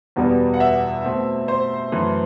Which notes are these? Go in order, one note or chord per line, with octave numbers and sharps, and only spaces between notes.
E2 B2 G3 B3
F#5
E5
B2 A3 C4
C5
F#2 E3 A3 C4